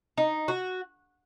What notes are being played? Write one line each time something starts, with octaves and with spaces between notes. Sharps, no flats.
D#4
F#4